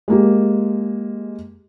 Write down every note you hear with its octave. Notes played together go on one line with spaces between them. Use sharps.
G#3 A#3 G4